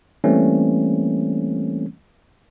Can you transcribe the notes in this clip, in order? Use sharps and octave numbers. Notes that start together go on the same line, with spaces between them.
E3 G3 A3 A#3 C4 C#4